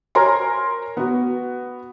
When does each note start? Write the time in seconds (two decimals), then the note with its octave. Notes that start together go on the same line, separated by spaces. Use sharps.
0.15 A#4 C5 C#5 G#5 A#5 C6
0.97 B3 F#4